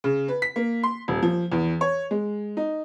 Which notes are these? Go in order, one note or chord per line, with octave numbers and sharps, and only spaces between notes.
C#3
B4
B6
A#3
C6
D#1
F3
E2
C#5
G#3
D#4